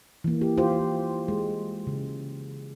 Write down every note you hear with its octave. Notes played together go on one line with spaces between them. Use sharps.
E3 A#3
G4
F4 G4 C5
G#3
C#3